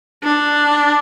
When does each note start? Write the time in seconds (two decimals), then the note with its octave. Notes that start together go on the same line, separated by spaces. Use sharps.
0.23 D4